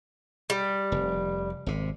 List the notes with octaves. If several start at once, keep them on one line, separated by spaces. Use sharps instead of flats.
G3
F1
G#1 C3